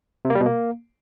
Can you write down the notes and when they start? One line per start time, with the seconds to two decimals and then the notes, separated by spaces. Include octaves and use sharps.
0.25 C3
0.30 A#3
0.35 G3
0.40 B2
0.46 A#3